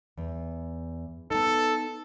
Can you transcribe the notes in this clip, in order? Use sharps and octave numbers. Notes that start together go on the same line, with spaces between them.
E2
B3 D#4 A4